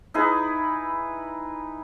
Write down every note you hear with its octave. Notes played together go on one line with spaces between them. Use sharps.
D#4 E4 G#4 B4